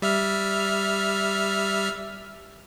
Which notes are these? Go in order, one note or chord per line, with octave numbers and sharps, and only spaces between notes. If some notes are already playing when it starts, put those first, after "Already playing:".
G3 E5 F6